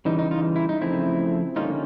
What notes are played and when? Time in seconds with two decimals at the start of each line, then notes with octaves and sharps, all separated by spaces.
0.05 C#3 E3 G3 D#4
0.19 D#4
0.31 D#4 F4
0.56 E4
0.69 D#4
0.81 C#3 F3 A3 C4 E4
1.56 D3 G3 A#3 C#4 D#4 F4